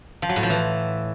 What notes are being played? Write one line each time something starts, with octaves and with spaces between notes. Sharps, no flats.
F3
F#3
A2
F3
E3